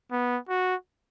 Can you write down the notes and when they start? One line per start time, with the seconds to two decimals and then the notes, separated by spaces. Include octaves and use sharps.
0.11 B3
0.49 F#4